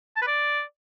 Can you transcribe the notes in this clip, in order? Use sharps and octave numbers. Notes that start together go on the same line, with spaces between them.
A5
B4
D5